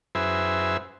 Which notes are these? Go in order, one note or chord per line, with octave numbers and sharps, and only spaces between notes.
F#2 E4 G#4 B4 C5 E5